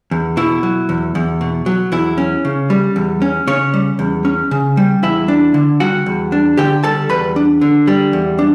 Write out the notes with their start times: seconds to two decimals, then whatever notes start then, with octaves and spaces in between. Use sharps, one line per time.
0.11 E2
0.37 B2 E4
0.63 F#3
0.89 E2
1.15 E2
1.41 B2
1.66 F#3
1.92 E2 E4
2.18 C#4
2.45 C#3
2.70 G3
2.96 E2
3.22 C#4
3.47 C#3 C#4 C#5
3.74 G3
3.99 E2
4.25 C#4
4.51 C#3
4.77 G3
5.03 E2 E4 E5
5.28 D4
5.54 D3
5.80 G3 F#4 F#5
6.06 E2
6.32 D4
6.57 D3 G4 G5
6.84 G3 A4 A5
7.09 E2 B4 B5
7.36 D4
7.61 D3
7.87 G3
8.13 E2
8.39 D4